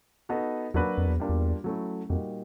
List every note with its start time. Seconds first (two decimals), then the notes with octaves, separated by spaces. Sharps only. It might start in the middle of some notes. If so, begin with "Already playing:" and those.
0.29 B3 D#4 F#4 A4
0.74 E2 F#3 A#3 D4 F#4 B4
0.97 F2
1.07 E2
1.20 G3 A#3 D4 F4
1.29 E2
1.64 F#3 A3 C#4 E4
2.09 F2 A#2 G3 A#3 D#4 F#4